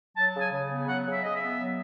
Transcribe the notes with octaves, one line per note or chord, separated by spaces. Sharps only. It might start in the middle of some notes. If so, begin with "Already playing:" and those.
F#3 A5
C#3
G#5
C#3
B3
F#3 F#5
C#3
E5
C#3 D#5
E5
B3
F#3